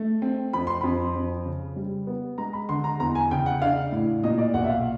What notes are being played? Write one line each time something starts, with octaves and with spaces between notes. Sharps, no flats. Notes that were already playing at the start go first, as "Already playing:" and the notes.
Already playing: A3
C4
F2 B5
C6
F2 B5
F2
C#3
G3
B3
G#3 A#5
B5
D3 C6
A#5
E2 A#5
G#5
C#3 G5
F#5
D4 F5
A2
A#2 D#5
D5
B1 F#5
E5
F5